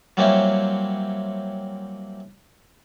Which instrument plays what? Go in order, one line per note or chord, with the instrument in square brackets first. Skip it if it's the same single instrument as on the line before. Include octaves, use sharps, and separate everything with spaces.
[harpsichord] F#3 G3 A#3 C4 C#4 E4